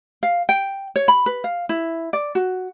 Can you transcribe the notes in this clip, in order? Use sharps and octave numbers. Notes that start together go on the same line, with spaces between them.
F5
G5
C#5
B5
B4
F5
E4
D5
F#4